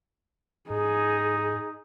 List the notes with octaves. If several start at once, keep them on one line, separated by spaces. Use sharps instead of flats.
G#2 D#4 G#4